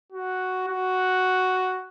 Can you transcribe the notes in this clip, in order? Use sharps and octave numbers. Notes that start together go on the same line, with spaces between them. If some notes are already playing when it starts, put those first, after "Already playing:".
F#4
F#4